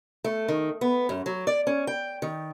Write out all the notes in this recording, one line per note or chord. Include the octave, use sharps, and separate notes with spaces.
A3
D#3
B3
F#2
F#3
D5
C#4
G5
D#3